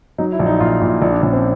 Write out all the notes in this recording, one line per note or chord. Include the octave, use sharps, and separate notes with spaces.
F#3 D#4
E4
A#1
D#4
A#2 F4
A#2 E4
A#1 D#4
D4
A#1 C#4
C4